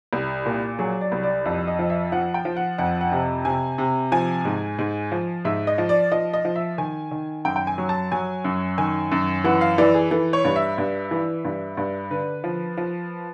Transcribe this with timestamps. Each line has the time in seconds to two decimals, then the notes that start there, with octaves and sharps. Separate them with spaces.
0.13 C2
0.46 A#2
0.79 F#3 G#4
1.01 D5
1.12 C2
1.23 D5
1.45 F2
1.67 D#5
1.79 F3
1.90 E5
2.12 F3 F#5
2.34 G5
2.45 F3
2.56 F#5
2.78 F2 F#5
3.01 F#5
3.12 C3
3.45 C3 G#5
3.78 C3
4.12 F3 G#5
4.45 G#2
4.79 G#2
5.12 F3
5.45 G#2 E5
5.67 D#5
5.78 F3
5.89 D5
6.12 F3 D#5
6.34 D#5
6.45 F3
6.56 E5
6.78 D#3 G#5
7.11 D#3
7.45 F#2 G5
7.56 G5
7.67 G#5
7.78 F#3
7.89 A5
8.12 F#3 G#5
8.44 F#2
8.78 D#3 G#5
9.12 F#2
9.44 E3 F#5
9.61 F5
9.78 E3 D5
9.94 G#4
10.11 E3 A4
10.33 C#5
10.45 G2
10.56 E5
10.78 G2
11.11 E3
11.45 G2
11.77 G2
12.10 D3 B4
12.44 F3
12.77 F3